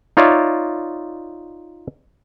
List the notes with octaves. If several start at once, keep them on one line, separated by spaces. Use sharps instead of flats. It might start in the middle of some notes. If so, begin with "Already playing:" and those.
D#4 F4 C#5 D5 E5